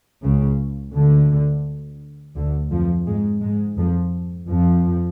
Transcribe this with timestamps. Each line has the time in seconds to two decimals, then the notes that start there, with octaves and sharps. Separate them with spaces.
0.22 C#2 C#3
0.93 D2 D3
2.35 D2 D3
2.70 F2 F3
3.06 G#2 G#3
3.41 G#2 G#3
3.77 F2 F3
4.48 F2 F3